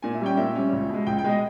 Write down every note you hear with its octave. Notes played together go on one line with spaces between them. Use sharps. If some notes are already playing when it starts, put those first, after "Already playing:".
A#2 G#5
E5
G3 C#4 G5
A#2 E5
G3 C#4
C#2
B2 G#3
C#2 G5
G5
B2 G#3 D#5